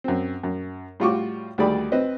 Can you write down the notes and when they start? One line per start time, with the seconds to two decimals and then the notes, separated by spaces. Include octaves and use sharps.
0.04 F#2 C4
0.43 F#2
1.00 A2 G3 F4 F#4 C#6 D6
1.58 D2 D#3 G3 G#4 D5 B5
1.92 C4 B4 D#5